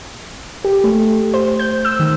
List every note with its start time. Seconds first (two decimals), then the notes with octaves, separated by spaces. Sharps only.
0.65 G4
0.84 A3
1.34 C5
1.59 G6
1.85 E6
2.00 D#3